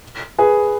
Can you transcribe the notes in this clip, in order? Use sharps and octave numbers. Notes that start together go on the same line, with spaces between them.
G#4 B4